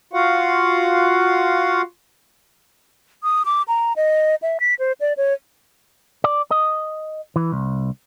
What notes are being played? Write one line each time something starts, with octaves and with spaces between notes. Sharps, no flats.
F4 F#4 F5 F#5
D#6
D6
A#5
D#5
E5
B6
C5
D5
C#5
D5
D#5
E3
C2